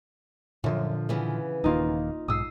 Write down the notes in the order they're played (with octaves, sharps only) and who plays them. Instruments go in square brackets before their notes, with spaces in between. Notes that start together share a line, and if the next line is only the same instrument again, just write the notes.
[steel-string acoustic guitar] F#2 [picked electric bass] A#2 D3 F3
[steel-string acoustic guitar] C#3 E3 B3
[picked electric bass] D#1 D#3 A#3 [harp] D#4 F4
[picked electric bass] B1 G#2 [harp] D#6 E6 C7